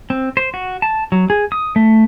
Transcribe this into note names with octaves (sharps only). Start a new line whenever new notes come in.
C4
C5
F#4
A5
F#3
G#4
D#6
A3